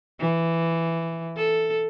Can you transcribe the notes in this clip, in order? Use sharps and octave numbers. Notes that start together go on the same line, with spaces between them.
E3
A4